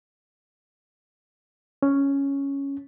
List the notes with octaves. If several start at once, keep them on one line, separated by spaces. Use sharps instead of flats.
C#4